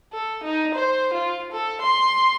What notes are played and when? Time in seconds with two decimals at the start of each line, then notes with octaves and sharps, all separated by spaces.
0.13 A4
0.44 D#4
0.74 C5
1.14 F4
1.52 A4
1.82 C6